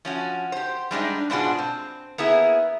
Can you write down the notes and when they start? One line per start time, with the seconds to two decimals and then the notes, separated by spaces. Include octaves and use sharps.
0.05 F3 C#4 F#4
0.52 G4 C5
0.91 G3 G#3 D4 D#4
1.30 G#2 B2 D4 F4 F#4 G#4
1.59 C4
2.18 A#3 B3 E4 G#4